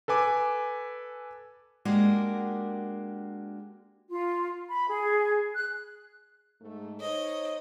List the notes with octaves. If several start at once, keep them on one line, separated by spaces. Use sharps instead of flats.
A4 B4 G#5 D6
G#3 A#3 D4 F#4 G4
F4
B5
G#4
F#6
G#2 A3
D#4 C5 C#5 D#5